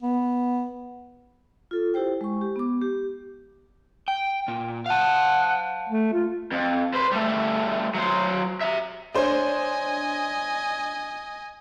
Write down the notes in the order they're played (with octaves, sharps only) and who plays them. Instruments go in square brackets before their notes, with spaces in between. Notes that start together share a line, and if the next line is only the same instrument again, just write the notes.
[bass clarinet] B3
[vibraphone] F4 A4
E4 G4 C5 G5
G#3 C#6
G4
B3 D6
G4
[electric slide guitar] G5
A#2
[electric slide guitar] F5 A5 [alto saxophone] F#5
[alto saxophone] A3
F4
[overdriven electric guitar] F2
B4 C5
G3 A3
F#3 C5
E5 A#5
[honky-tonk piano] D4 C5 C#5 [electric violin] D#5 G#5